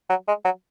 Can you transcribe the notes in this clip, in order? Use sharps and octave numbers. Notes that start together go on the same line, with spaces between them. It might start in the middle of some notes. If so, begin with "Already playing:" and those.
F#3
G#3
F#3